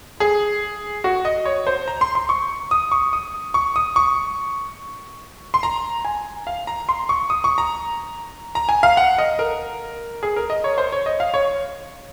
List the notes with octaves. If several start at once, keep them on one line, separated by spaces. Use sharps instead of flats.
G#4
F#4
D#5
C#5
C5
A#5
C6
C6
C#6
D#6
C#6
D#6
C#6
D#6
C#6
C6
A#5
G#5
F5
A#5
C6
C#6
D#6
C#6
A#5
A#5
G#5
F5
F#5
D#5
A#4
G#4
A#4
D#5
C#5
C5
C#5
D#5
F5
C#5